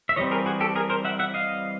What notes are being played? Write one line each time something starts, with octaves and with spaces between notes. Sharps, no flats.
E5
E3 G3 C4 C#5 D#5
G#4 A#4
F#4 G#4
G4 A4
G#4 A#4
A#4 C5
E5 F#5
E5 F#5
D#5 F5